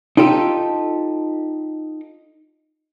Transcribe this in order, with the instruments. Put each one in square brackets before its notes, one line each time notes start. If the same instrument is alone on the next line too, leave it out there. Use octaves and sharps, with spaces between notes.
[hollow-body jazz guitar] D#4 F4 G4 A4